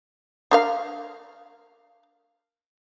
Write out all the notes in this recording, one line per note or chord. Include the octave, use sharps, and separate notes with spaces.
D4 A#4 F5